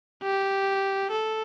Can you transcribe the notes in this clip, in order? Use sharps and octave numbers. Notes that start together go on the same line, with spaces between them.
G4
A4